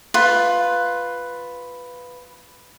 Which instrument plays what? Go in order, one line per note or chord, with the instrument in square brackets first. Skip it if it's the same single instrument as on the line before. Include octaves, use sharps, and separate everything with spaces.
[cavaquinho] F4 B4